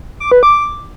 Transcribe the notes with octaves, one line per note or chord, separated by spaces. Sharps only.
D6
B4
D6